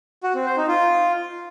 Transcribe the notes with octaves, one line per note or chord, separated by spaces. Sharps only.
F#4
C4
C5
D#4
F4